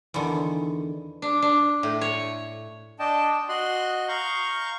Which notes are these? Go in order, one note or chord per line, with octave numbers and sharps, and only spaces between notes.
E2 D3 D#3
D4
D4
A2
C#5
D4 D#5 G5 A5
F#4 D#5 C6 F#6
F5 A#5 C#6 G6